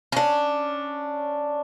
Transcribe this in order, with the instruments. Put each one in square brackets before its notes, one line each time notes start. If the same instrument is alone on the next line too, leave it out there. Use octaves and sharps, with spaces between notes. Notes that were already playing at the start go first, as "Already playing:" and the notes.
[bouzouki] C#4 D4